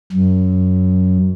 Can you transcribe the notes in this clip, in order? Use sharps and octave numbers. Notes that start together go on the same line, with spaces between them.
F#2